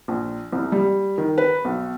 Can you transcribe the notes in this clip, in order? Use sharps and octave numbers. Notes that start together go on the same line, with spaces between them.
A#1
C2
G3
D#3
B4
B1